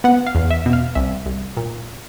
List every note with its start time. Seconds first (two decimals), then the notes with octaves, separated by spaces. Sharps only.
0.04 B3 F#5
0.27 F5
0.35 E2
0.50 E5
0.66 B2
0.73 F5
0.95 C2 E5
1.26 C2
1.57 A#2